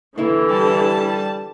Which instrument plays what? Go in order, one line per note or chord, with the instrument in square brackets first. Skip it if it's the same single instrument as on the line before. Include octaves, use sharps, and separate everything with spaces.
[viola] D3 E3 [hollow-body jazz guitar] A#3 E4
[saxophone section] G3 [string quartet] A5